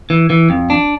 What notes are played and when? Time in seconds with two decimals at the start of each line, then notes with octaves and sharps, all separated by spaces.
0.10 E3
0.30 E3
0.50 F2
0.70 D4